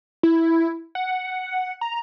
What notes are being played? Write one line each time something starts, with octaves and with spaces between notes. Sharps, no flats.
E4
F#5
A#5